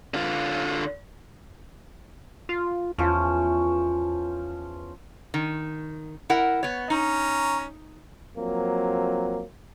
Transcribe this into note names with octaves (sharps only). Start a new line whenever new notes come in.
D3 F4
F4
E2 F3 C#4
D#3
E4 A#4 F#5
B3 C#5
C#4 D#4 A#5
F3 F#3 A#3 C4